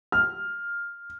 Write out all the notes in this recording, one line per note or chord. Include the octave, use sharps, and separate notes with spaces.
F6